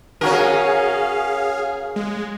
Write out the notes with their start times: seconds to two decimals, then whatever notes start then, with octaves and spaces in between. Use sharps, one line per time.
0.21 C#4 F#4 G#4 A#4 F5
1.96 G#3